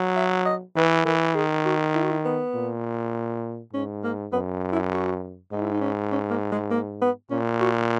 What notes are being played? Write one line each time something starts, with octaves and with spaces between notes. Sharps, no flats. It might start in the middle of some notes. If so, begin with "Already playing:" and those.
Already playing: F#3
E5
D#5
E3 B4
E3 A#4
D#3 G#4
F#4
E4
F#4
E4
B3
A#2
G#2 C#4
A#3
F#2 B3
E4
F#4
G#2 D#4
E4
D#4
C#4
C#4
A#3
G#3
A#3
B3
A#2 C#4
F#4